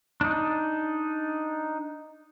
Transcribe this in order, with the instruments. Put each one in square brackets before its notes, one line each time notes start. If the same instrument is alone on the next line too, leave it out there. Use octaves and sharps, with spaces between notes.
[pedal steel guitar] D4 D#4